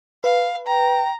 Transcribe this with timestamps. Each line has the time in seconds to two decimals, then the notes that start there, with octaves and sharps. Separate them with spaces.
0.24 B4 F5
0.67 G5 A#5